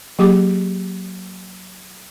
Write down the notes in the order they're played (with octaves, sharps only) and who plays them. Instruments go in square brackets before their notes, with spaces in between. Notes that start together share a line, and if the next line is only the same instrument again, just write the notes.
[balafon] F#3 A#3 G4 G#4 D6